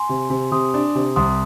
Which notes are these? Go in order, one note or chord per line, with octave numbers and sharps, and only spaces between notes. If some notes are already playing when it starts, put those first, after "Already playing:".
Already playing: G#5 C6
C3
C3
C3 C6 D#6
D4
C3
C2 C6 D#6